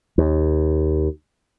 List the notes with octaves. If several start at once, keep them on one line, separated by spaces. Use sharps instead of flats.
D#2